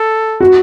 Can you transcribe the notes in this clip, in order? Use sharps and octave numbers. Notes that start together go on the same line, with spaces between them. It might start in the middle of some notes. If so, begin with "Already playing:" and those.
Already playing: A4
F#4